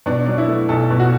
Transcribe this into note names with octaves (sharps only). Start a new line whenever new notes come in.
B2 D4
F#3 D4
E4
A3
B1 A4
B2
F#4